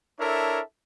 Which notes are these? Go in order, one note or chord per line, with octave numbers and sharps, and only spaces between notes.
D4 E4 A4 A#4 C#5 E5